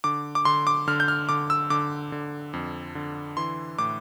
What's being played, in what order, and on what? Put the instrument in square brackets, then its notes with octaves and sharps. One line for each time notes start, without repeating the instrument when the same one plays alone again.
[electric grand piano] D3 D6
D6
D3 C6
D6
D3 F6
G6
F6
D3 D6
E6
D3 D6
D3
F2
D3
E3 C6
A2 D6